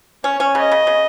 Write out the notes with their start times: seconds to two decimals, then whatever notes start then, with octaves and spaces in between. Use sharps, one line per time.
0.24 C#4 C#5
0.40 C#4
0.55 C#3 D#5
0.72 C#3
0.87 C#3